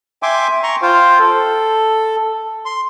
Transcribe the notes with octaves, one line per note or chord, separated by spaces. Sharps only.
E5 G5 G#5 C6 D6
A#5 C6 C#6
F4 C5 F5 G5
A4
C6